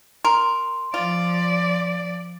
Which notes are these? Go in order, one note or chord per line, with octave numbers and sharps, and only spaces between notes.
A#4 C6
F3 F4 D5